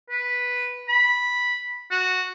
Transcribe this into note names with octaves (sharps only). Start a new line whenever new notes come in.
B4
B5
F#4